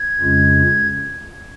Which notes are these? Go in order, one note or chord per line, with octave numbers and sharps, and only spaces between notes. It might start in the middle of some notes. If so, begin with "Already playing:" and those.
Already playing: G#6
F2 C#3 G#3 C#4 F4